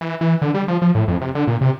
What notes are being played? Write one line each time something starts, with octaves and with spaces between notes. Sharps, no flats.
E3
E3
D3
G3
F3
F3
A2
F2
C3
D3
A#2
C3